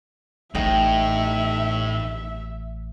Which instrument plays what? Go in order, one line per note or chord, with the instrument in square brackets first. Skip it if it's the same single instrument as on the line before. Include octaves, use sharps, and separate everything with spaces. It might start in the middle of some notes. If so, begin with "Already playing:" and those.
[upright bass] A1 [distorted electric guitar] A2 [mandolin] D#4 G5 [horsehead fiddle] E5